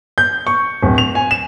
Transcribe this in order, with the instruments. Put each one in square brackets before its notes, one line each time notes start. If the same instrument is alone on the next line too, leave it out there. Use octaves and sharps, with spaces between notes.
[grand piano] G6
C#6
D1
F7
G#5
E7